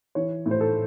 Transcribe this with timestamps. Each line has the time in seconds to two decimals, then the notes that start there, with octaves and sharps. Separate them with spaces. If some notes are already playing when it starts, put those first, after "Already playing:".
0.15 E3 C#5
0.46 A2
0.51 C5
0.61 A4